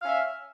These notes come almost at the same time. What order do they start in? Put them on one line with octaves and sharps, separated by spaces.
F5 C#4 E5